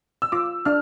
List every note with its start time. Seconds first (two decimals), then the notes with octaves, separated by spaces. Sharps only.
0.22 E6
0.32 F4 D6
0.65 D4 F6